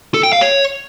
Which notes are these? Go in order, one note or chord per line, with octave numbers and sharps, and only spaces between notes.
A4
G5
F5
C#5